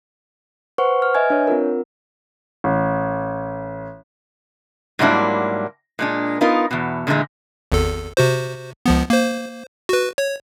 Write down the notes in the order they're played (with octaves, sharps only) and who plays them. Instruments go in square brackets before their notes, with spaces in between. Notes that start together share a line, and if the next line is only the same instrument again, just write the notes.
[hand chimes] B4 C5 F#5 C#6
F6
B4 D#5 E5 G#5 G#6
D4 C#5
C4 F4 A#4
[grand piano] A1
[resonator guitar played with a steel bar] G#2 F#3 G3 A#3 D4 E4
A#2 G#3 D4
B3 D#4 F4 A#4
E2 B2
A#2 D3 E3 G#3 A3
[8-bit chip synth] G#1 E2 A4
C3 F#4 C5
C#2 F3 B3
A#3 C5
F#4 B4
C#5